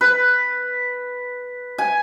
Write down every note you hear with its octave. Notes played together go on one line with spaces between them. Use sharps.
B4
G#5